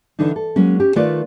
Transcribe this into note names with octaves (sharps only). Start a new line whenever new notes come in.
D3 E3 D4 D#4
A4
F#3 G#3 A#3 C#4
C#4 G4
D#3 A3 F4 B4 D5